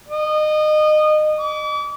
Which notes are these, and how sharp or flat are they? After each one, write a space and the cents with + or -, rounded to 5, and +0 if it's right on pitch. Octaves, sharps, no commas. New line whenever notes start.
D#5 -25
D6 -40